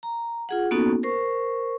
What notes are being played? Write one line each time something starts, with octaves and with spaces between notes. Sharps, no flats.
A#5
F4 G#4 F#5
A#3 B3 C#4 D#4 F#4 A4
A#4 C5 C#6